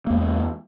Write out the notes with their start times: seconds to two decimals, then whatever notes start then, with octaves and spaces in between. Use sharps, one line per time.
0.07 A#3
0.10 E2
0.14 G#3